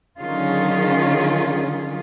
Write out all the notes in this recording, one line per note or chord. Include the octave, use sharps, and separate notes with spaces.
D3 D#3 F#3 C#4 F4 G#4